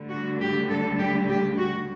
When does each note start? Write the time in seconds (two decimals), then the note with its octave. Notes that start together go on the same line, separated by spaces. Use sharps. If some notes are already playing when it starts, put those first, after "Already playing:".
Already playing: D2 D3 G3
0.10 F#4
0.40 G4
0.69 A4
0.98 G4
1.28 G4
1.58 F#4